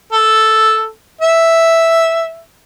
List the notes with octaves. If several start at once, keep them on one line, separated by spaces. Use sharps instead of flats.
A4
E5